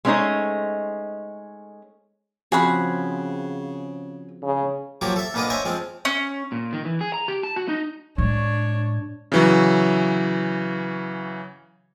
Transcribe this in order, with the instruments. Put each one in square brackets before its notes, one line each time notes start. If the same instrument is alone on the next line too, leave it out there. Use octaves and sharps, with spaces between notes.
[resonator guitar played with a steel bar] G#3 A3 C#4 D#4 C5 D#5
[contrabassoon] C#3 [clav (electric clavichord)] F3 C4 F#4 [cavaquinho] G#4 F#5 B5
[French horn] C#3
[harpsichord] F3 F#3 A#3 F#4 G4
A4 E5
A#1 A#3 B3 D4 B4 D#5
C5 C#5 D#5 E5 G#5 D6
F3 G#3 C4
[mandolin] C#4
[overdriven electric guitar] A#2
D#3
E3
G#4
A#5
G4
A5
F#4
D#4
[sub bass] A2 [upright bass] G#3 [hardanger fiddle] D4 [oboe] C#5
[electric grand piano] C#3 E3 F#3